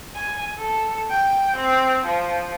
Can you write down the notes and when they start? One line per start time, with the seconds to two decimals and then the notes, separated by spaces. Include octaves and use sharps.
0.16 G#5
0.58 A4
1.10 G5
1.57 C4
2.06 F3